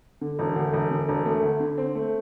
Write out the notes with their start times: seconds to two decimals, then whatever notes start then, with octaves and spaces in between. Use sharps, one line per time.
0.21 D3
0.39 E1
0.56 D2
0.74 E1
0.91 D3
1.09 E1
1.25 A3
1.42 D2
1.60 D3
1.78 C4
1.95 A3